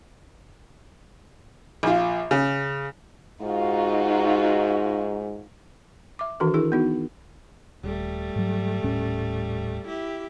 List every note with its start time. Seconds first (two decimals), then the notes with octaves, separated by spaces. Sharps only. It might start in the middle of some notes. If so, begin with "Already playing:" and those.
1.83 A#1 F4
2.31 C#3
3.42 G#2 D#4 F4 F#4
6.19 E5 D6
6.40 D#3 E3 D4 F#4 A4
6.54 D4 E4 G#4 A#4
6.72 B3 D#4 F#4
7.83 D#1 G3 A3
8.36 G#2 F#3
8.84 D#1 A2 C#4
9.87 E4 G4